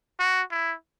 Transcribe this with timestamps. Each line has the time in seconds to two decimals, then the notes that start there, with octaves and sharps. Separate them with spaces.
0.19 F#4
0.52 E4